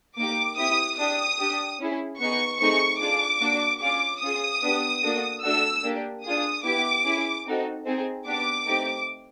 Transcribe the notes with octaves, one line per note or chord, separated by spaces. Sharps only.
A#3 D#4 G4 D6
C4 E4 G4 D#6
D4 G4 D#6
D4 G4
C#4 E4 G#4
B3 D#4 G#4 C#6
A3 C4 D#4 G#4 C#6
D4 F4 G#4 D6
A#3 D4 F#4
C#4 F4 G#4 D6
C#4 F4 G#4 D#6
B3 D4 G4
A#3 D4 F#4 A4
A3 D4 F#4 A4 E6
A#3 D4 G4
D4 F4 G#4 D#6
B3 E4 G4 D6
C#4 E4 G#4
C4 D#4 F#4 A4
C4 D#4 G#4
B3 D4 G4 D6
A3 C4 D#4 G4